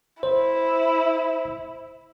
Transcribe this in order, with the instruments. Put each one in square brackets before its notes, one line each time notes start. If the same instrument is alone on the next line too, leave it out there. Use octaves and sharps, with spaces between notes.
[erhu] E4 [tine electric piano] C5